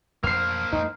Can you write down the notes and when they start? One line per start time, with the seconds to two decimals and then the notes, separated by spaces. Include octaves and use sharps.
0.24 F2 A#3 C5 F6 C7
0.73 F2 G#3 D#4